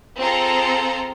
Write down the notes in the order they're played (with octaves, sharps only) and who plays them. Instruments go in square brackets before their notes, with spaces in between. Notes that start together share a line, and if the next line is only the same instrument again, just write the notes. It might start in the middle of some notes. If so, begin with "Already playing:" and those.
[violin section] C4 F4 G#4 A4 A#5 C6